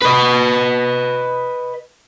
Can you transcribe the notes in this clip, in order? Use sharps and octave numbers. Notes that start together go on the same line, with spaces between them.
B4 D#5